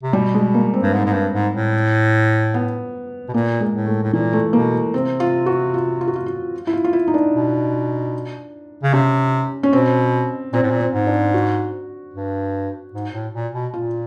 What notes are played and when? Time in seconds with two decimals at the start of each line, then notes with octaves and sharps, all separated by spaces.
0.03 C3
0.13 B2 G3
0.34 G#3
0.54 A#3
0.73 C4
0.82 G2
0.94 G#2
1.06 G#2
1.13 G2
1.34 G#2
1.54 A2
2.54 B3
3.29 B2
3.34 A#2 A#3
3.60 G#3
3.74 A2
3.86 A3
4.03 A2
4.13 A#2 E3
4.33 A3
4.53 B2 A#3
4.94 C3 C4
5.20 F4
5.46 F#4
5.74 F4
6.01 F4
6.08 F#4
6.16 F4
6.26 F4
6.67 E4
6.73 F4
6.84 F4
6.93 E4
7.08 D#4
7.14 D4
7.33 B2
8.83 C#3
8.93 C3 C#4
9.63 C#4
9.73 B2 C4
10.53 A#2 C4
10.63 A2
10.71 A#2
10.80 C4
10.93 G#2
11.07 D4
11.34 F#4
12.14 G2
12.94 G#2
13.14 A2
13.34 A#2
13.53 B2
13.74 A#2 F4